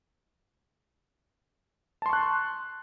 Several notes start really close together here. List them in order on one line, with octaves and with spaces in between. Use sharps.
A5 C6 C#6 F#6